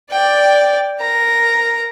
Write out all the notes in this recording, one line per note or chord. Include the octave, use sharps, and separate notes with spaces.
D5 G5
A#4 A#5